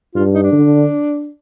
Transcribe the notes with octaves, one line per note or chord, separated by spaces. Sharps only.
G2 F4
D#4
D4
D3